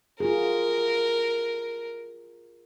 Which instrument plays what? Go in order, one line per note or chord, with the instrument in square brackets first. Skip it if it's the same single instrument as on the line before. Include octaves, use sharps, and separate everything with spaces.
[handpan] F4 F#4 G#4 [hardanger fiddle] A#4